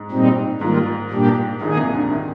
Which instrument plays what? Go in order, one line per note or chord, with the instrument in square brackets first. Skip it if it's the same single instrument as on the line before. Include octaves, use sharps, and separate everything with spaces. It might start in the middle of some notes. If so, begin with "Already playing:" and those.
Already playing: [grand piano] G#2
[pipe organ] A#2 G3 C4 D#4
[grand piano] G#2 [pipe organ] D#3 G3 A#3 F4
[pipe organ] A#2 G3 A#3 D4 G4
[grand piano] A#1 A#2 [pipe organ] D#3 A#3 D#4 G#4
[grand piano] C2 C3
D2 D3
D#3